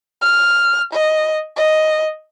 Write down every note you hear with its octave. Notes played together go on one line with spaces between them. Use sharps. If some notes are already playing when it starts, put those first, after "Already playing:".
F6
D#5
D#5